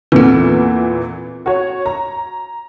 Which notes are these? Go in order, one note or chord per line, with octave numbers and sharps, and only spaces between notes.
E2 A#2 E3 C4 A4
F#4 C#5
A#5